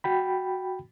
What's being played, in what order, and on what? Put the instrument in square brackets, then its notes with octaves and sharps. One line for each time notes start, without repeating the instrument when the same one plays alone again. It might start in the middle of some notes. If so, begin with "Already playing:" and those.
[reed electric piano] F#4 G5 B5